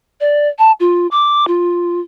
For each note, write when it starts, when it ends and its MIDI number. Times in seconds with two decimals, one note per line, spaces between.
0.20 0.48 74
0.59 0.72 81
0.80 1.07 65
1.11 1.47 86
1.47 2.00 65